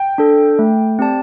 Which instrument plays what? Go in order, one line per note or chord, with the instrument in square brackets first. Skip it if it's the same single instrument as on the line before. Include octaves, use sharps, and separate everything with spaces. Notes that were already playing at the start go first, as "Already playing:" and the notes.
Already playing: [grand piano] G5
[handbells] D4 A4
A3
C4 G4 D5 A5